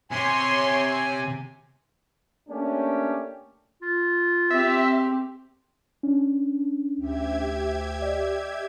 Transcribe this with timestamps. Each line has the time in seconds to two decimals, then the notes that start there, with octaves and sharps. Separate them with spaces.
0.11 C3 C#5 G#5 C6
2.49 A3 A#3 C#4 D4 G4
3.82 F4
4.51 C4 G4 E5
6.03 C#4 D4
7.00 D2 G4 E5 G#6
8.02 D5 D#5